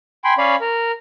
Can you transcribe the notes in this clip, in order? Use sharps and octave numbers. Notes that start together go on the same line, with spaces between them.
G5 G#5 B5 C6
C#4 C#5 D5 F5 B5
A#4